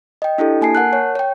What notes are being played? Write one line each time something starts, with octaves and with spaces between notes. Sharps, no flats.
D#5 G5
D4 E4 G4 A4
A#3 G#5 A5 C7
A#4 F#5 A5 F#6
C#5
C#5 G5